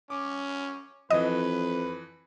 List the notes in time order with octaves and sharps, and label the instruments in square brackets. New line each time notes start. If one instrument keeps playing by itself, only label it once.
[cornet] C#4 [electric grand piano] D6
[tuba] F2 [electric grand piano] E3 F3 D#6 [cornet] B4 [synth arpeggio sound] D#5